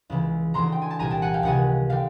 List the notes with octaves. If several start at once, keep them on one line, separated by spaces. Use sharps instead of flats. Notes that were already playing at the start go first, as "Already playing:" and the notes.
C#2 C#3 E3
D2 C#3 E3 A#5 C6
G5
G#5
A5
C2 A#2 G#5 A#5
G5 A5
F#5 G#5
F5 G5
C#2 C3 D#3 F#5 G#5
D3 F5 G5